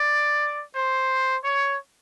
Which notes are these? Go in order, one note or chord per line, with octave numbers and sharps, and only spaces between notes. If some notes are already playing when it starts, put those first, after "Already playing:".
Already playing: D5
C5
C#5